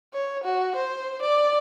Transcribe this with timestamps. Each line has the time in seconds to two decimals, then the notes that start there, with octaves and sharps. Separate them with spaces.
0.14 C#5
0.44 F#4
0.76 C5
1.22 D5